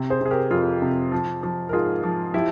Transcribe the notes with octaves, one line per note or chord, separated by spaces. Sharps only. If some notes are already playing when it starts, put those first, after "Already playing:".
Already playing: C3
G#4 C5
C3 G#4
G4 A#4
F2 F4 G#4
C3
F3
F3
A#4
G#2 F4 G#4
F3
F3 E4 G4